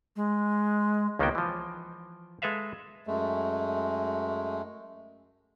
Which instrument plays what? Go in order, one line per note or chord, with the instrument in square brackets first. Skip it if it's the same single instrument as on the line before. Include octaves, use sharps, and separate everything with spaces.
[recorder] G#3
[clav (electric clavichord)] C#2 D#3 A#3 B3 F#4 G5
E3 F3
G#3 A4 B4 E5 F5
[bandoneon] F#2 G#3 A3